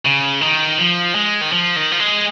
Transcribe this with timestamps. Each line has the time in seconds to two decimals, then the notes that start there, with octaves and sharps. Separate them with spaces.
0.05 C#3
0.41 D#3
0.78 F3
1.15 G#3
1.41 D#3
1.52 F3
1.76 D#3
1.92 F3
2.00 G#3